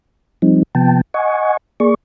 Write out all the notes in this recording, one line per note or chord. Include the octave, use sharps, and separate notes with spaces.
F3 G3 C4 D#4
C3 F3 B3 G5 A5
D#5 F#5 G#5 C#6
A#3 G#4 D5 C#6